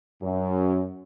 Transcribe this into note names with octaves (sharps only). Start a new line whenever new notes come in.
F#2